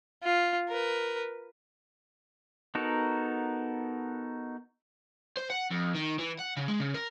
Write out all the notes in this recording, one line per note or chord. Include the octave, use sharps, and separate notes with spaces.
F4
A#4 B4
B3 D#4 F#4 A4 A#4
C5
F#5
F2
D#3
E3
F#5
C#3
G#3
C#3
A#4